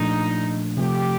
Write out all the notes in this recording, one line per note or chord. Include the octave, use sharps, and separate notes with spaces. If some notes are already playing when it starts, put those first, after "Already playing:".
Already playing: A#2 F3 A3 D4 D#4
C3 F3 A3 G4